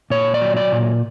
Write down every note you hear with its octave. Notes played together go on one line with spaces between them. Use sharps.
A#2 C#5
D5
F#3
D5
A#2